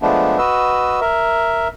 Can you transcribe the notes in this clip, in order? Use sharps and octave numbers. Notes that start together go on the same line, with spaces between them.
F3 G#3 A3 B3 D4
F#4 B4 D#5 E6
A#4 E5